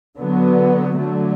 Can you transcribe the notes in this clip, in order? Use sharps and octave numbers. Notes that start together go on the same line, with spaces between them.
D3 F#3 B3
D3 F#3 A3